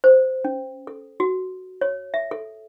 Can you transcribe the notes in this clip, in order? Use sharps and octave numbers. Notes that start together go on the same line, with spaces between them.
C5
C#4
A4
F#4
C#5
E5
A4